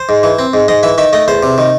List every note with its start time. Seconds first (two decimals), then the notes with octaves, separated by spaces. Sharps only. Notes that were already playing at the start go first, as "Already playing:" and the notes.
Already playing: C5
0.09 G#2
0.23 E3
0.39 C4
0.54 G#2
0.68 G#2 D#5
0.83 E3 E5
0.98 D#3 E5
1.13 A3 D#5
1.28 E2 C5
1.43 C3
1.58 D#3